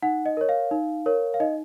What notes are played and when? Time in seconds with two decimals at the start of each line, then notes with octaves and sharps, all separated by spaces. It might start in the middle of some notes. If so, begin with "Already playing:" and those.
0.03 D#4 F#5
0.26 D#5
0.37 A#4 C#5
0.49 F5
0.71 D#4
1.06 A#4 C#5
1.34 F5
1.40 D#4 D#5